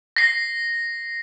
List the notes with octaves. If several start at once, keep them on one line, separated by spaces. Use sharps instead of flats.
A#6 C7